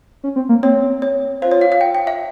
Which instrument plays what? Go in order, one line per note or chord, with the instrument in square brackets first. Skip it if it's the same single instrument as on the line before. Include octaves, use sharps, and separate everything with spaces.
[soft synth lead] C#4
C4
A#3
[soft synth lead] C4 [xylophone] C#5
[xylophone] C#5
[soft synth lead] F4 [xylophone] C5
[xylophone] C#5
F5
F5
G5
G5
E5